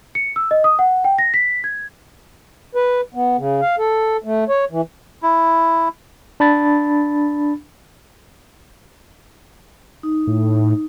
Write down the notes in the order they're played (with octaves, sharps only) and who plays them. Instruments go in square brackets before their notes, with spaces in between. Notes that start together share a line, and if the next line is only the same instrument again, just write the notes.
[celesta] C#7
E6
D#5
D#6
F#5
G5
A#6
B6
G#6
[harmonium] B4
B3
C#3
F5
A4
A3
C#5
E3
[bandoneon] E4
[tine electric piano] D4 B5 A6
[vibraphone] D#4
[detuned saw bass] A2